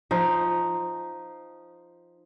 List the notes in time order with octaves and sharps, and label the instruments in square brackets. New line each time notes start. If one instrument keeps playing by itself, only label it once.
[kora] F3 D#4